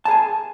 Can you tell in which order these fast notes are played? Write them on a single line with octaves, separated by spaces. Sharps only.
A5 G#4 G#5